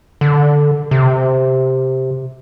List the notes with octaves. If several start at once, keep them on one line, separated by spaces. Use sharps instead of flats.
D3
C3